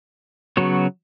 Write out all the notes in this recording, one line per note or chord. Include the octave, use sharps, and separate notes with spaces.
C#3 F#3 B3 F#4 C#5